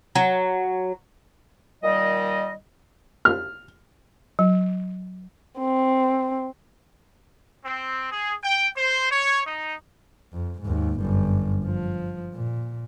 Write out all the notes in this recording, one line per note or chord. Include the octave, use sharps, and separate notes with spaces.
F#3
A#2 D#3 G3 D#5
F6
F#3
C4
C4
G#4
G5
C5
C#5
D#4
F2
D#2 G#2
G1 F#2
F3
A#2